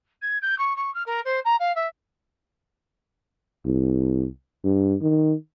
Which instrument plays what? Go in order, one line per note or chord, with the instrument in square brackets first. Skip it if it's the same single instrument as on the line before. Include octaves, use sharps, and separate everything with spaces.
[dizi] G#6
G6
C#6
C#6
F6
A#4
C5
A#5
F5
E5
[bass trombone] C2
G2
D#3